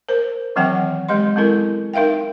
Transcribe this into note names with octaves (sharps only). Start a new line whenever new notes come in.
A#4 C5
D#3 E3 F#3 C4 F#5 G5
G#3 G4 D#5 C6
G#3 B3 C4 E4 A4 A#4
D#4 A#4 E5 F5 G5